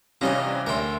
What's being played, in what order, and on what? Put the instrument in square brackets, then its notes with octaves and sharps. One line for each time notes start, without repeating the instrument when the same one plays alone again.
[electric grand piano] C3 E3 [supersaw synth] G3 C#4 A#6 [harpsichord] F4 D#5 F5
[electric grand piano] D2 E5 C6 [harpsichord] A#4 G5